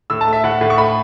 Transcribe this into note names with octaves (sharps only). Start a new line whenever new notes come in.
A2 E6
A5
A3
E5
A2 F#5
A2
C#6
A3 B5